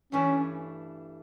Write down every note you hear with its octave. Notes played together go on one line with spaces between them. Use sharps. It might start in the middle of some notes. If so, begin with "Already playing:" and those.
G2 E3 A3 C#4 D4